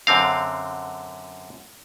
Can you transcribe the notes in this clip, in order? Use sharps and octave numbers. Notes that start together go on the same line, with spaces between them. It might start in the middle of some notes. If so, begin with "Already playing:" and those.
F#2 D3 C4 F5